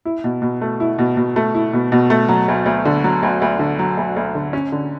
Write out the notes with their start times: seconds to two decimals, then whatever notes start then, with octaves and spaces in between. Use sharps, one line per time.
0.05 E4
0.24 B2
0.42 B2
0.61 A3
0.80 E4
0.99 B2
1.17 B2
1.36 A3
1.55 E4
1.73 B2
1.92 B2
2.10 A3
2.28 F#3
2.48 D2
2.66 D2
2.85 D3
3.04 F#3
3.23 D2
3.42 D2
3.59 D3
3.79 F#3
3.97 D2
4.16 D2
4.35 D3
4.53 C#4
4.72 D3